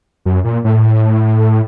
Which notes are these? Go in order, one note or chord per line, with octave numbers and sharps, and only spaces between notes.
F#2
A#2
A2